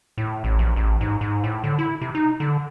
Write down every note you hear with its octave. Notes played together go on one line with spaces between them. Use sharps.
A2
A1
A#1
A1
G#2
G#2
A2
D3
E4
C3
D#4
D3